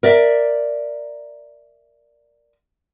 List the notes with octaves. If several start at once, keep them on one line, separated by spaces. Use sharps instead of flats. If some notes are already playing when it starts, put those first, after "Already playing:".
A#4 D5 E5